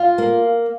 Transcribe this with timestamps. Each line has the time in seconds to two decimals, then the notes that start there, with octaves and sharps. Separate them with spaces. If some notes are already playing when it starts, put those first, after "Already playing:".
Already playing: F4
0.18 A#3